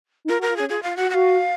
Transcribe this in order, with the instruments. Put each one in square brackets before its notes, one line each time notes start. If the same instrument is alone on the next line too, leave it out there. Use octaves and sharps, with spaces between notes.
[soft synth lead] D#4
[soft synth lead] F4 [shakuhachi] A#4
[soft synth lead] F#4
[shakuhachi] A#4
[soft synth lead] F4
[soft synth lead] C#4 [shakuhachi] G#4
[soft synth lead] F4 [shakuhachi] G#4
[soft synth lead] F4 [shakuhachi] F5
[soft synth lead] F#4 [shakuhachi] F#5
[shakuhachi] F#5
[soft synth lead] F#4 [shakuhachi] F5